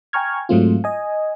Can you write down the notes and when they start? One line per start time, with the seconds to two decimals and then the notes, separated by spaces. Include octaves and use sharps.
0.13 G5 G#5 A#5 C#6 F6 G#6
0.49 G#2 F#3 G#3 A3 C4 F4
0.84 D#5 G#5